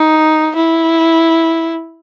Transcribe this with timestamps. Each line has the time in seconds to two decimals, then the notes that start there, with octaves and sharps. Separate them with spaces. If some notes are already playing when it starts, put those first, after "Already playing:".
Already playing: D#4
0.56 E4